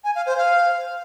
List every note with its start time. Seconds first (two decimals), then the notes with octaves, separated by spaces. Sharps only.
0.04 G#5
0.15 F5
0.26 C5
0.37 F5